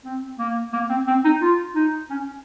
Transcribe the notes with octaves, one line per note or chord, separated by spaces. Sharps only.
C4
A#3
A#3
C4
C4
D#4
F4
D#4
C#4